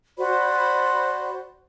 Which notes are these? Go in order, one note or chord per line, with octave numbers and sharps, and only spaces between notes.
F#4 C5 D5 B5